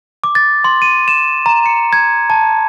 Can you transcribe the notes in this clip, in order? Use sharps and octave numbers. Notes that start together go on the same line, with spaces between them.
D6
A6
C6
D#7
E7
A#5
C#7
G#6
A5